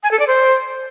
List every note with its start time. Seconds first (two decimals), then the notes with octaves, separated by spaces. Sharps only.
0.03 G#5
0.11 A4
0.19 D5
0.27 C5